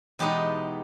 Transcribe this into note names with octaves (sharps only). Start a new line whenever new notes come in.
E2 B2 G#3 B3 D#4 G4